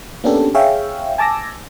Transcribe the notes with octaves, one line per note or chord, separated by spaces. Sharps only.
A#3 B3 C#4 D4 G4 A4
G#4 C#5 E5 F5 G5
G#5 A5 D6 E6 A#6